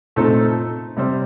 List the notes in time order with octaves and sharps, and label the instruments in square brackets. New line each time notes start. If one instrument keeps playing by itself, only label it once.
[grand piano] A#2 A3 C4 D#4 A4
C3 G3 C4